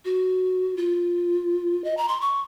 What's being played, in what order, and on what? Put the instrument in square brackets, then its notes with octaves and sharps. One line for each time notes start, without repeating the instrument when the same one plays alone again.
[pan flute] F#4
F4
D#5
A#5
C6
C#6